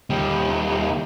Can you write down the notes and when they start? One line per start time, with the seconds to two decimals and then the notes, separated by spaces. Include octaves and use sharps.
0.10 D#2 G3